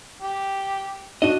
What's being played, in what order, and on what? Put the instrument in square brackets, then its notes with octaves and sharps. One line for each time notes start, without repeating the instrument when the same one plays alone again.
[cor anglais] G4
[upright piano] D4 [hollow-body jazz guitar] F#4 D#5